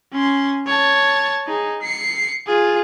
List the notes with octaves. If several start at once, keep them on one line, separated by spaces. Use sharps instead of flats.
C#4 C6
C#5 A5
D#4 G#4
C7 C#7
F4 G#4